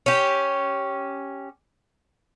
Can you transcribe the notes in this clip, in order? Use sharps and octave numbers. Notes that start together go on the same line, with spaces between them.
C#4 G4